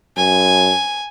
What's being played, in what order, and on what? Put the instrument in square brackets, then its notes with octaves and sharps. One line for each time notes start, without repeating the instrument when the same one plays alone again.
[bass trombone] F#2 [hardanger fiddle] G#5